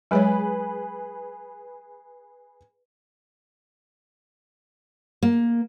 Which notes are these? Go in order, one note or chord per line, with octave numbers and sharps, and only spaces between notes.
F#3 G#3 G#4 B4 C#5
A#3